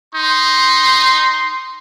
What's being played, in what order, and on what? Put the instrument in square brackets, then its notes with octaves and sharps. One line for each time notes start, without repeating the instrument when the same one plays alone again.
[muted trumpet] D#4 [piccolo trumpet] C6